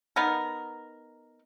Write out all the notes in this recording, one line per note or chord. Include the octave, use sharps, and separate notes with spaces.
B3 D#4 A#4